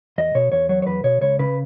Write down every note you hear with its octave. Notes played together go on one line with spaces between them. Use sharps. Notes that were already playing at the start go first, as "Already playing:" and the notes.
E2 D#5
B2 C#5
E2 C#5
F#3 C#5
C#5
E2 B4
B2 C#5
C#2 C#5
C#3 B4